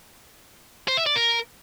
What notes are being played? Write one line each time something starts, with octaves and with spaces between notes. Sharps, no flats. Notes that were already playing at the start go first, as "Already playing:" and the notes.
C5
E5
D5
A#4